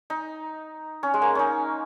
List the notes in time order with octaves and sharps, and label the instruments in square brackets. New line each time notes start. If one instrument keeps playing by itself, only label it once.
[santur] D#4
C#4
G#3
A#3
C#4 D#4